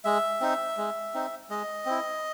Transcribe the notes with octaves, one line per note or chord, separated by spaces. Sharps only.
G#3 E5
C4 D#4
G#3
C4 D#4
G#3 D#5
C4 E4